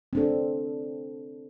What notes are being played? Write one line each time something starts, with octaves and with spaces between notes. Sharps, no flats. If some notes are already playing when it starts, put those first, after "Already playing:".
C4 D4 A4